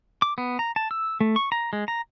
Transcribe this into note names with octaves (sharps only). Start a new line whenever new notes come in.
D6
B3
A#5
A5
E6
A3
C#6
A#5
G#3
A#5